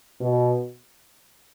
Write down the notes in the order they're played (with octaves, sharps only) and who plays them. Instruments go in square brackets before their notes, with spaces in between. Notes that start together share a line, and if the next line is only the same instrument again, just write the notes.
[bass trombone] B2